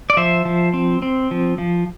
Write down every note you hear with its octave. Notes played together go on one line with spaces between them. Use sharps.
D5
F3 C5 E5
F3
C4
C4
F3
F3